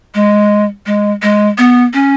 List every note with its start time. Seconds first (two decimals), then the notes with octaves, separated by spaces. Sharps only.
0.15 G#3
0.86 G#3
1.22 G#3
1.58 B3
1.93 C#4